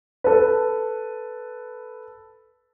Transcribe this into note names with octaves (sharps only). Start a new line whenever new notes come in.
A4 B4